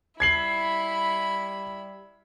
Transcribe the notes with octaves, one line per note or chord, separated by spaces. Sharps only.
G3 E4 B5 G#6 C7 F#7